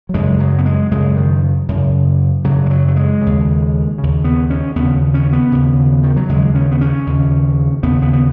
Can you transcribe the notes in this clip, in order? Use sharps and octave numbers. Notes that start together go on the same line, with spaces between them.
F#3
F#2 C#3 G#3
F#3
B3
G#3
F#2 C#3 G#3
D#3
F#2 C#3
F#2 C#3 F#3
G#3
F#3
F#3
G#3
C#3
D#2
D#2 C#3
B3
C#4
D#2 C#3 B3
C#4
B3
D#2 C#3
D#3
F#3
D#2 C#3 G#3
C#4
B3
C#4
D#2 C#3
D#2 C#3 B3
B3
B3